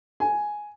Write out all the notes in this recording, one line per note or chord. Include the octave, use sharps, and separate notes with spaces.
G#5